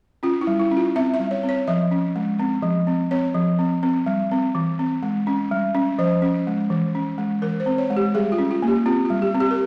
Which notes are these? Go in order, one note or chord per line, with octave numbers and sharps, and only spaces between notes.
C#4 F4
E4
G3
E4
C#4
F4
C4 E5
E5
G3
C#5
C4
C#5
F3 E5
C#4
G#3
C4
F3
C4
C4 C#5
F3
C4
C4
G3
C4
E3
C4
G#3
C#4
G3
C#4
F3 C5
C#4
G#3
E3
C#4
G#3
E3 A#4
C5
C4
C#5
G#3
G4
G3 G#4
F4
C#4
F4
A#3
G4
C4 F4
F4
G3
G4
C4
G4
A#4